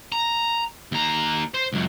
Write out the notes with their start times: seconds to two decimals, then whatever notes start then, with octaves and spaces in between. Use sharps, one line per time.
0.12 A#5
0.92 D#2 A#5
1.54 C5
1.73 C#2 F#2